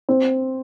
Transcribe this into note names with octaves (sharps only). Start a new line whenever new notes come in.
C4